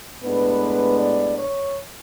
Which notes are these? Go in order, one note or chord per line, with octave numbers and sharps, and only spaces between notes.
A2 G#3 B3 D4 B4
D5
C#5